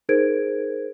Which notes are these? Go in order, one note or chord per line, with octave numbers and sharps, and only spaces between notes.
D#4 G#4 A#4 C5 G#6 D7